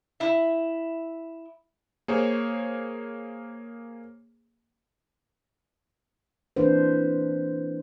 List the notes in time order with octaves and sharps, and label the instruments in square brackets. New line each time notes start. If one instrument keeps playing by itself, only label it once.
[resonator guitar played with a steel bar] E4 E5
[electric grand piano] A#3 G#4 C5 C#5
[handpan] E3 A#3 C4 D4 B4 C5